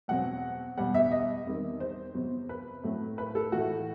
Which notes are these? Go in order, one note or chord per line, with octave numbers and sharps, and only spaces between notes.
E2 B2 F#3 C4 F#5
E2 B2 G3 B3 F#5
E5
D#5
E2 D#3 G3 C4
C5
E2 C3 F#3 B3
B4
A2 F#3 A3 C4
B4
A4
A2 E3 A3 F#4